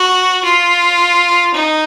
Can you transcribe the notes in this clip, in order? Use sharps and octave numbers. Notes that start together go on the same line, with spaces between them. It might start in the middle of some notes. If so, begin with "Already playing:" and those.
Already playing: F#4
F4
D#4